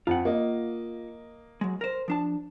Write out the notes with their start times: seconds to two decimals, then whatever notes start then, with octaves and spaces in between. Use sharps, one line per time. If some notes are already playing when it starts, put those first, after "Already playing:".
0.07 F2 F4 F#5
0.25 A#3 D#5
1.61 F#3 G#3
1.81 A#4 C5
2.08 F3 D4 A5